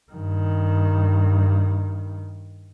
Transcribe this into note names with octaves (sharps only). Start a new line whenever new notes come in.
G2 D#3